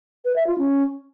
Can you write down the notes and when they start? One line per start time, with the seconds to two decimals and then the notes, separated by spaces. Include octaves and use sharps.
0.25 B4
0.36 E5
0.47 F4
0.58 C#4